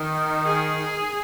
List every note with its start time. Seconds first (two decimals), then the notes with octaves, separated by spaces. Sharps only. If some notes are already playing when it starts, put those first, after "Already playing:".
Already playing: D#3
0.45 G#4